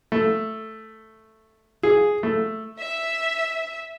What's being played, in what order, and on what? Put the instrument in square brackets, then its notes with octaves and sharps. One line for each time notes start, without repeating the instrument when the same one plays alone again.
[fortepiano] A3
G#4
A3
[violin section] E5